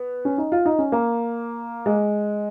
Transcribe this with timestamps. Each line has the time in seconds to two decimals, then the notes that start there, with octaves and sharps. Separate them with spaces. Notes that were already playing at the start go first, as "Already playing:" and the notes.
Already playing: B3
0.25 C#4
0.38 D#4
0.52 F4
0.66 D#4
0.79 C#4
0.92 A#3
1.86 G#3